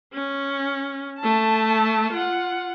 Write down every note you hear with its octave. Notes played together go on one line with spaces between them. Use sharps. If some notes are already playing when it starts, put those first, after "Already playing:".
C#4
A3 A5
F4 F#5